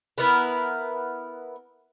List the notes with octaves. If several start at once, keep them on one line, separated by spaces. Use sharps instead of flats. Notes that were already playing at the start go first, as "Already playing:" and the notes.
B3 E4 A#4 B4